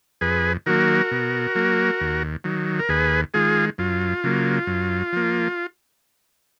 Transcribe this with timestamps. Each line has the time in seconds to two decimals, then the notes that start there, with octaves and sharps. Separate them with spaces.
0.21 F2 G#4 B4
0.66 D#3 F#3 A#3 F#4 A#4
1.11 B2
1.55 F#3 A#3
2.01 D#2
2.44 D#3 F#3
2.79 A#4
2.89 D#2 G#4 B4
3.34 D#3 G#3 F4 G#4
3.78 F#2 F4
4.24 C#3 F#3 A#3
4.67 F#2
5.13 F3 A#3